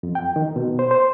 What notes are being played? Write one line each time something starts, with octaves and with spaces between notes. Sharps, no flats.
F2
G5
D#3
B2
C5
C5